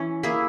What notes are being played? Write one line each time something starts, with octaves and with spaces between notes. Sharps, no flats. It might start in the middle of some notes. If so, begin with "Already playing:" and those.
Already playing: E3 C#4
A#3 E4 G#4